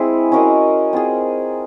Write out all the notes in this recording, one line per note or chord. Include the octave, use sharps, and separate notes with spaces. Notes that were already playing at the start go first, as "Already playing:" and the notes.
Already playing: G#3 C4 E4 G#4
C#4 F#4 A#4 D#5
C4 F4 G#4